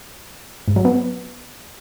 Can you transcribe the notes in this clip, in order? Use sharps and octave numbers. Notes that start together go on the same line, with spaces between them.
G#2
F#3
B3